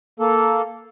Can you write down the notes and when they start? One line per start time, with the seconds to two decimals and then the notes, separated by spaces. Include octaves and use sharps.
0.20 A#3 A4